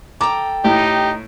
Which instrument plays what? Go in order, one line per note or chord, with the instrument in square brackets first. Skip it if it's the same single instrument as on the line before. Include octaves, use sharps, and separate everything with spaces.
[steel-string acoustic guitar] A4 G5 [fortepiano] A#5 D6
[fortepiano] A2 [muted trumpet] D#4 [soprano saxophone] G4